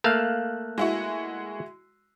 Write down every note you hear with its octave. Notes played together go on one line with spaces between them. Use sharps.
A3 A#3 F5 F#6 E7
G#3 E4 F#4